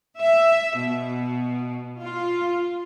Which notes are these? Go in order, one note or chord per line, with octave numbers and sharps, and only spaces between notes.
E5
B2
F4